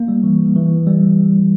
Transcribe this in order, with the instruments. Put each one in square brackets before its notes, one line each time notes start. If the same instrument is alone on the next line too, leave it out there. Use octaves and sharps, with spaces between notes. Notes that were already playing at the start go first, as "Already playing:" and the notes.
Already playing: [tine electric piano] A#3
G3
E3
E3
G3